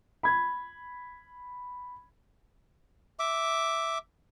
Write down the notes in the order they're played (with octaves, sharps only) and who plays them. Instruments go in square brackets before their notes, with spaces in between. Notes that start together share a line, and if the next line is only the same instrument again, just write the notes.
[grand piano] B5 G#6
[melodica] E5 D6